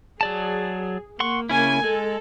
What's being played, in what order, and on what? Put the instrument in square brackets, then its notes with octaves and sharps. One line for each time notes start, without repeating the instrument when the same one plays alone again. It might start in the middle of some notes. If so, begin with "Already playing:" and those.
[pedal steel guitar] F#3 D5 A5 [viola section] G#4
[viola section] A#3 [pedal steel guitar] F#5 C6 C#6
[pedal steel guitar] C#3 C#4 E4 [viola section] A#3 G#5
[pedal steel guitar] G#3 [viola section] A4